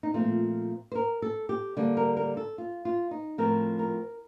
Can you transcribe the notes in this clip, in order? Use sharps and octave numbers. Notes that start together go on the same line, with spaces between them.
D#4
A#2 F3 A3 C4 F4
C5
A#4
A4
G4
D3 G3 A#3
A#4
A#4
A4
F4
F4
D#4
A2 F3 C4 A#4
A#4